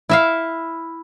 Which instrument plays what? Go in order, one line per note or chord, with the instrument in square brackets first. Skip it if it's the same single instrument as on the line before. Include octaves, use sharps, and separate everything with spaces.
[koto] E4 E5 F5